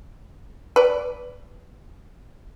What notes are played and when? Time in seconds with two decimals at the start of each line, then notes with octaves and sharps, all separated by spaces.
0.76 B4 D5